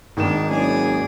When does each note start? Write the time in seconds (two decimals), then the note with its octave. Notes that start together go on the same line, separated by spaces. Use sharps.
0.17 G#1 D#3 G#3 D4 E7
0.51 F#1 G#4 D5